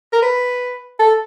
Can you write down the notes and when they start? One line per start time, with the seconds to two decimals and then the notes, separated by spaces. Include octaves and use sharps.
0.13 A#4
0.22 B4
1.00 A4